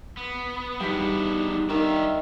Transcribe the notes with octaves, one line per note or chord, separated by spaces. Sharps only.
B3
E2 G3 B3 D4 D#4 G5 B6
D#3 D5 E5 F5